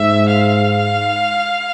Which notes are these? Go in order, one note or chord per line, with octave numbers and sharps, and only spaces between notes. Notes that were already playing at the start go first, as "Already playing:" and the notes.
Already playing: G#2 E5
F5